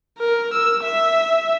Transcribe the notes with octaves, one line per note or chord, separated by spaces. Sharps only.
A#4
E6
E5